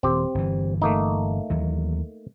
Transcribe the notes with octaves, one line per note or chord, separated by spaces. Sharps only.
D#1 C4 G4
G1 E3
A3 A#3 D#4
D#2 E3 F#3